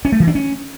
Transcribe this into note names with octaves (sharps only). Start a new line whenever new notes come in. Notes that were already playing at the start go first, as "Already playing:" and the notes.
C#4
A3
E3
D4
C#4